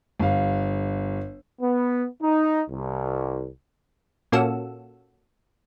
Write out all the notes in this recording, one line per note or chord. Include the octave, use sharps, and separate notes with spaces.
G1 F5
B3
D#4
C2
A#2 A#3 C#4 F#4 A4 E6